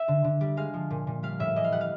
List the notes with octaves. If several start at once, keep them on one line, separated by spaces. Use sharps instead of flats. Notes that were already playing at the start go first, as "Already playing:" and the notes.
Already playing: E5
D3
D3
G3
G#3 F5
F3
A#2
A#2
G3 F5
A2 E5
E3 D#5
F5
G3 F#5
F5